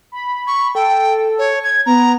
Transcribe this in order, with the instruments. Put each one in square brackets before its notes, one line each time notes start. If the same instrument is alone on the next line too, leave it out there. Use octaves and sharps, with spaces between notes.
[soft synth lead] B5
[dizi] C#6
[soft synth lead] A4 [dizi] G5
[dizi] C#5
G#6
[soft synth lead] B3 [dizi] A#5